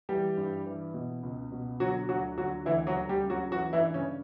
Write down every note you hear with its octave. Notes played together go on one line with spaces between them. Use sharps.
E3 G3 G4
G2
E3
B2
C#2
B2
D3 F#3 F#4
D2 F#3 F#4
D3 F#3 F#4
D2 E3 E4
F#3 F#4
D2
G3 G4
C#3
F#3 F#4
E3 F#3 F#4
E3 E4
G2
C#3 C#4